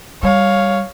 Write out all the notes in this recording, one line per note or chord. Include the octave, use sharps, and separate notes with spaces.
G3 C#5 F5